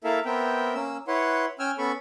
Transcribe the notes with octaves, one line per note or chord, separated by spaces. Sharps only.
A#3 E4 A4 A#4 E5 F5
B3 C4 A#4 E5 G5
A#3 C#4 E6
E4 B4 C#5 F#5 C6
C#4 G5 G#5 E6 F6
B3 C#4 A4 B5 C#6